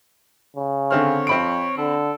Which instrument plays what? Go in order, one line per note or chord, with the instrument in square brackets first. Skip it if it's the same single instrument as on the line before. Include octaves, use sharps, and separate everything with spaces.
[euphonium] C#3
[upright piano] D3 C4 F6 [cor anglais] C#5
[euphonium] F2 [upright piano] C4 B5 D7
[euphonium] D3 [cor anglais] A4